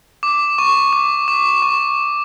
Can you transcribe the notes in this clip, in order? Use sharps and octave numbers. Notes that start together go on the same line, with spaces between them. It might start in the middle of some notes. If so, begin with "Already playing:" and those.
D6
C#6
D6
D6
C#6